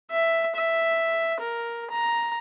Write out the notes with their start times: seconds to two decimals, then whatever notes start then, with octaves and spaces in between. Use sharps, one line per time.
0.11 E5
0.56 E5
1.41 A#4
1.91 A#5